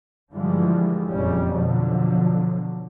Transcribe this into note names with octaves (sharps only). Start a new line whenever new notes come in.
G2 D3 E3 F3 G3 G#3
F#1 F2 A#2 C#3 G3 C#4
B2 D3 F3 F#3